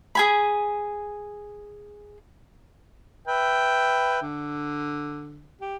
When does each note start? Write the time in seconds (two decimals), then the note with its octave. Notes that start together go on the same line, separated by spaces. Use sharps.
0.15 G#4 G#5 B5
3.28 B4 E5 G5
4.22 D3
5.61 G4